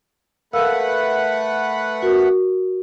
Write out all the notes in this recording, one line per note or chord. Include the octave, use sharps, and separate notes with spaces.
A3 A#4 B4 F5 F#5 E6
F#4 A#4